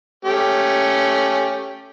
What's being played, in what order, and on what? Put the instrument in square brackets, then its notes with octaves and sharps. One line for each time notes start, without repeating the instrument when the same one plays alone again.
[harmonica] A3 C#4 G4